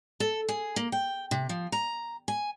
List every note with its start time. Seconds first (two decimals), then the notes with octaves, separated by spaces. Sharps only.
0.20 A4
0.49 G#4
0.76 A#3
0.92 G5
1.31 C3
1.49 F3
1.72 A#5
2.28 G#5